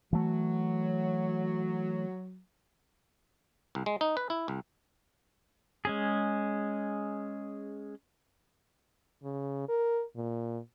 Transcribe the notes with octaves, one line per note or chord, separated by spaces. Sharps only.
E3 F#3 A3
C2
G#3
D#4
B4
E4
C2
G#3 C#4 G#4
C#3
A#4
A#2